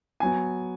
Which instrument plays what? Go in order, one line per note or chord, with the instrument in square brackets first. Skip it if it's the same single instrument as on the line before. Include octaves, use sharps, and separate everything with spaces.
[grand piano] F#3 B3 G#5